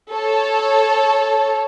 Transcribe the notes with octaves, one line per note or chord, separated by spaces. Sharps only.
A4 C#5